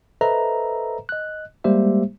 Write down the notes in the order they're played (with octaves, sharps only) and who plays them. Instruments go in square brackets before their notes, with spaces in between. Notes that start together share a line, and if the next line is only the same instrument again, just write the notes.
[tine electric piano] A4 B4 C5 D#5 E5 A#5
D#5 F#6
G3 G#3 A#3 G4 C5 E5